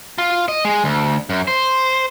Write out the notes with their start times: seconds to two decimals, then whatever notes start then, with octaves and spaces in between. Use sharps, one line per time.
0.18 F4
0.48 D#5
0.65 G#3
0.84 D2
1.30 F#2
1.48 C5